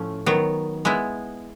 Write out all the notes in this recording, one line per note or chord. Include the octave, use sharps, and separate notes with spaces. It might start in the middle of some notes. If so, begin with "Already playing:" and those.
Already playing: A2 F3 A3 C#4
D#3 F#3 B3
G#3 B3 E4